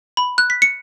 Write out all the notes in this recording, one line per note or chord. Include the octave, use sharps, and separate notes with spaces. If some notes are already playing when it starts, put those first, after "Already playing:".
B5
F#6
B6
C#7